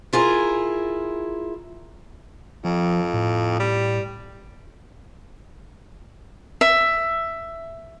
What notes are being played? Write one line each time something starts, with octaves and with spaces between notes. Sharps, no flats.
E4 F4 G#4 A#4
F2 F3
A2
G3
E5